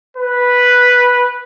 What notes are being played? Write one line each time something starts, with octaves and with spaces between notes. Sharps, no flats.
B4